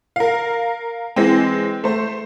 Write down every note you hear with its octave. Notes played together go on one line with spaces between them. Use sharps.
A#4 F5
E3 G#3 C4
A3 C5